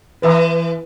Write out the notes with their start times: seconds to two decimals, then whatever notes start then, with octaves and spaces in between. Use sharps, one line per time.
0.22 E3 B4 E5 A#5